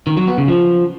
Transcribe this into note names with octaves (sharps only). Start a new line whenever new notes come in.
D#3
F#3
B3
C#3
F3